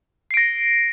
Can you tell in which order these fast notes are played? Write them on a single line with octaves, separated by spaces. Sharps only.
C7 D7 A#6